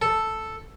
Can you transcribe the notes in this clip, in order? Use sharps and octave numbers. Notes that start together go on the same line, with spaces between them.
A4